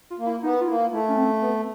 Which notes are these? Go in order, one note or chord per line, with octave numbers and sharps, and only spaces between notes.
F4
A#3
E4
B3 D#4
F4
A#3 E4
A3 E4
C#4
C4
B3